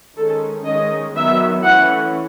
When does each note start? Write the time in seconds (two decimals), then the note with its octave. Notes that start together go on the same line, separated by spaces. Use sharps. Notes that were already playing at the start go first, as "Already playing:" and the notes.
0.17 D#3 G#3 C#4 A4
0.66 D#3 G#3 C#4 D#5
1.15 D#3 F#3 B3 E5
1.64 E3 A3 C#4 F#5